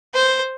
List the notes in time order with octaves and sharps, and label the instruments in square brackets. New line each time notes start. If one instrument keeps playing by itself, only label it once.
[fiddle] C5